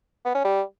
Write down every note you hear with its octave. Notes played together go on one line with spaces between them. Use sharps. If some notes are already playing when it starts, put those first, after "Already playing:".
B3
C#4
G3